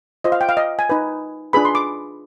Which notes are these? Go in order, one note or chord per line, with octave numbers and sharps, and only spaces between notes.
F4 C5 D#5
F5
G5
F5
D#5
G#5
D#4 B4
D4 F4 G#4 B4 B5
C6
D6